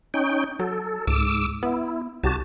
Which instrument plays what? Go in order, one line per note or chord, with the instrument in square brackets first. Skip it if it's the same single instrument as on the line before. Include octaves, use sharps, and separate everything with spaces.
[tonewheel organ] C#4 D#4 G5
[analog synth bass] F#3 [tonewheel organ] A4
[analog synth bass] C#2 [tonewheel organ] G#2 D6 E6
[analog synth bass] B3 [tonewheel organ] E4
[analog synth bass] C2 [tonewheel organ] F#4 G4 A5